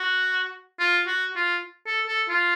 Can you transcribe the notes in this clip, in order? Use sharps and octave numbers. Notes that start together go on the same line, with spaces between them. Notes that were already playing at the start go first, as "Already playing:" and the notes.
Already playing: F#4
F4
F#4
F4
A4
A4
F4